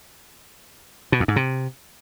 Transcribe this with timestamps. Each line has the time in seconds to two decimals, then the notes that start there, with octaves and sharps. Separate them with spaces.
1.12 B2
1.20 F2
1.28 G#2
1.36 C3